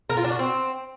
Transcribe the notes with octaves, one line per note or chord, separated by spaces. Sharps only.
A#4
F4
D4
F#4
C4